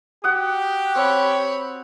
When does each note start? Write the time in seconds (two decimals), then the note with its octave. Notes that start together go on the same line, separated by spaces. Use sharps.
0.24 F#4 G4 F#5 D#6
0.95 C4 C#5 B5